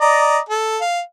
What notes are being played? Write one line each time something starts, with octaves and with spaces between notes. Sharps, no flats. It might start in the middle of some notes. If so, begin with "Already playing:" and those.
D5 D#5 A#5
A4
F5